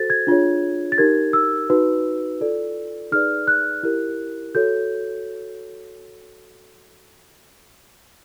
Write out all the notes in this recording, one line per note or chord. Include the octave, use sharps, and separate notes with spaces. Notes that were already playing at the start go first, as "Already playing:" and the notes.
Already playing: F#4 A4 C5 A6
G#6
D4 F4 G#4 C#5
A6
D#4 G4 A#4 G#6
E6
D#4 F#4 B4
F4 A4 D5
D#4 G#4 B4 D5 F6
F#6
E4 G4 A#4
F#4 A4 C#5 G6